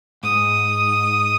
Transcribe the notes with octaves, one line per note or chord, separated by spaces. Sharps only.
G#2 D#6